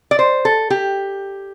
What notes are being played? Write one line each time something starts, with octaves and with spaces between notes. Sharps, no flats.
D5
C5
A4
G4